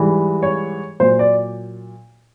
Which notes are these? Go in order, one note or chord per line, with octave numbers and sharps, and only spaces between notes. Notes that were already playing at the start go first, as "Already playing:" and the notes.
Already playing: G#2 E3 G3
C#5
A#2 F#3 C5
D5